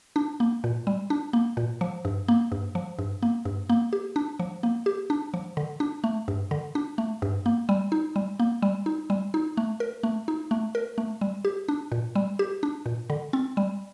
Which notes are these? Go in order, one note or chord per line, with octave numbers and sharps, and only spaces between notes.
D4
A#3
A#2
G3
D4
A#3
A#2
F3
G2
A#3
G2
F3
G2
A#3
G2
A#3
G4
D4
F3
A#3
G4
D4
F3
D3
D4
A3
G2
D3
D4
A3
G2
A#3
G3
D#4
G3
A#3
G3
D#4
G3
D#4
A3
A#4
A3
D#4
A3
A#4
A3
G3
G4
D4
A#2
G3
G4
D4
A#2
D3
C4
G3